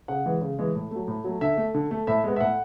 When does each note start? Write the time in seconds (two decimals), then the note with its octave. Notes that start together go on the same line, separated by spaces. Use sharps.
0.08 C#3 F#5
0.26 E3 G#3
0.42 C#3
0.59 E3 G#3
0.75 A2
0.91 F#3 A3
1.08 A2
1.24 F#3 A3
1.41 D3 E5
1.57 A3
1.74 D3
1.91 A3
2.07 A2 E5
2.24 G#3 B3
2.36 E5
2.40 A2 F#5